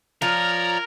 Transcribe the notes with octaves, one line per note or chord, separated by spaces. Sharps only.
F3 A#4 C#5 D5 A#5